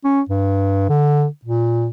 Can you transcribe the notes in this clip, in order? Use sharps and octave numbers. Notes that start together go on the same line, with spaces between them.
C#4
G2
D3
A#2